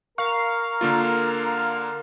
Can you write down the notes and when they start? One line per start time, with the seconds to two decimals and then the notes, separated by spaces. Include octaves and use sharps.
0.18 A#4 F5 A#5 C#6
0.81 D3 A#3 F4